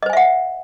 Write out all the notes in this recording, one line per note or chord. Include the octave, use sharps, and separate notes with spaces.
C5 D#5 E5 F#5 G#5